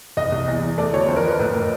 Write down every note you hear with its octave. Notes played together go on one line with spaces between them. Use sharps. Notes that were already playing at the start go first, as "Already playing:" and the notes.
C2 D#5
C2
E2
E2
A3 D5
D2 C#5
F2 C5
A#4
F2 B4
A2 B4
A2 A#4